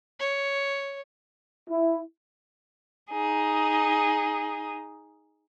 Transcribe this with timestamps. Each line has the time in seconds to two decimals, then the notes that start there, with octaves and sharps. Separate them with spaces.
0.19 C#5
1.69 E4
3.11 D#4 G#4